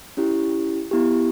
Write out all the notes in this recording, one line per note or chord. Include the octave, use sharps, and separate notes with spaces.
C#4 E4 G4
B3 E4 G4